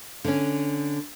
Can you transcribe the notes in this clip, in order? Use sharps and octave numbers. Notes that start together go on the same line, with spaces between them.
D3 C#4